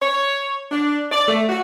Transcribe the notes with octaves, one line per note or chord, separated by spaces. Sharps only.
C#5
D4
D5
A3
F#4